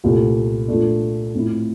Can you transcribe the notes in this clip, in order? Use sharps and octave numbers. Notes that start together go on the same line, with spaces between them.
C2 A#2 A3
A#2 F3 A3 D4
A2 F3 C4 E4